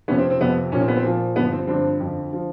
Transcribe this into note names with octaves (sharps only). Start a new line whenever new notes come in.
F2 C3 F3 B3 C#4
C4
C4
F2 C3 F3 B3
A#2 F3 C#4
C4
B3
C4
A#2 F3
G2 D3 F3 B3
C4
G2 D3 F3 C4 D4
F2 D3 F3
D3 F3